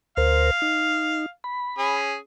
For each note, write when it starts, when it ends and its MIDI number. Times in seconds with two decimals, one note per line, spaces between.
0.17 0.51 38
0.17 0.51 70
0.17 0.51 72
0.17 1.28 77
0.62 1.26 63
1.44 2.01 83
1.78 2.16 61
1.78 2.16 68